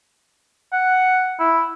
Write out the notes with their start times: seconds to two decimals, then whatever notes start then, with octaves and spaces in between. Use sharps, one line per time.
0.72 F#5
1.39 E4